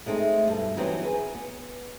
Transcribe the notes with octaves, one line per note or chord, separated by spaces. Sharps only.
G#3 A3 C4 D#4
G2 B2 A4
E3 F#3 G3 B3 C4 D#4
G#4 B4 G#5
B3